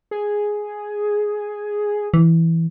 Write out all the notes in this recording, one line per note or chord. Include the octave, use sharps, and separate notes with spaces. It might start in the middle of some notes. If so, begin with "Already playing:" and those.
G#4
E3